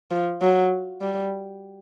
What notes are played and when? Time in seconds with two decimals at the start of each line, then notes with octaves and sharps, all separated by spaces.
0.11 F3
0.42 F#3
1.01 G3